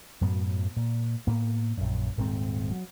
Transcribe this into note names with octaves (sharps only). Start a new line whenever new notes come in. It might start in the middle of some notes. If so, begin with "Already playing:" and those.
F#2 A2 F#3 B3
A#2
A2 A#3 B3
A#1 F#2
D#1 G#2 A#3 C4
F#3